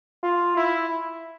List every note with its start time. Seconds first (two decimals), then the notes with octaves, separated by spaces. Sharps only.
0.23 F4
0.57 E4